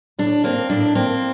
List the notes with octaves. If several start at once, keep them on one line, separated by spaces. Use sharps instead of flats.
A2 D4
A#3 C4
A2 D4
A#3 C4